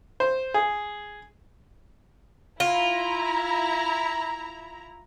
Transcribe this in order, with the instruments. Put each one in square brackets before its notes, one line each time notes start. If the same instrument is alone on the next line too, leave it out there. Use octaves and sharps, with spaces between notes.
[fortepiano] C5
G#4
[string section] E4 A#5 [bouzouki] F4